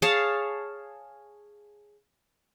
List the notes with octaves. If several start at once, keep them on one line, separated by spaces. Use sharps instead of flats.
G#4 C#5 F5 A5